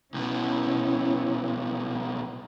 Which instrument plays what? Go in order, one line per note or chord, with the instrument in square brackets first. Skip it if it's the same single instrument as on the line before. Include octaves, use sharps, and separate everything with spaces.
[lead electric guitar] C2 B2 [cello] C#4 [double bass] E4